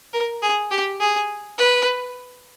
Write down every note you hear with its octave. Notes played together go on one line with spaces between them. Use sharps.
A#4
G#4
G4
G#4
B4